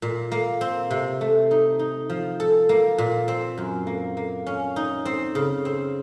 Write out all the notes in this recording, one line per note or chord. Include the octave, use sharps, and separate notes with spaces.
A#2
A#3
C4
C3
A3
D#4
D#4
F3
A4
A#3
A#2
C4
F#2
A#3
A#3
C#4
D#4
C4
C#3
C4